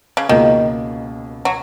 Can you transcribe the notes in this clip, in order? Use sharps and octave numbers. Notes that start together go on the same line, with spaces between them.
C#3
C#2 B2 D#3 A#3
F#3